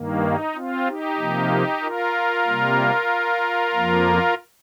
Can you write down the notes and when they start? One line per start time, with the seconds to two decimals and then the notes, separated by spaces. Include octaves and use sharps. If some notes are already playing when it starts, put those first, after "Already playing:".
Already playing: G2 D#3 A#3
0.23 D#4
0.55 C4 F4
0.87 D#4 G4
1.19 C3 F3 A#3
1.82 F4 A#4
2.46 C3 G3 A#3
3.74 F2 F3 A#3